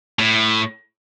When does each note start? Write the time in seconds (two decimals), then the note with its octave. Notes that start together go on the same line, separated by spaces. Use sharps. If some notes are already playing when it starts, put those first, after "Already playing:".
0.19 A2